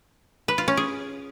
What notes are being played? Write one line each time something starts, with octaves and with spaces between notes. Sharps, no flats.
B4
F4
C#4
G#4